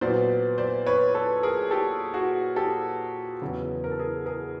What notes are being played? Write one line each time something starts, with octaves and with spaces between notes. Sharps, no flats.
A#2 F#3 B3 C5 D5
C5 D5
B4 C#5
A4 B4
G#4 A#4
G4 A4
F#4 G#4
G4 A4
E2 C#3 F#3 B3
A#4
A4
G#4 A#4
G#4 A#4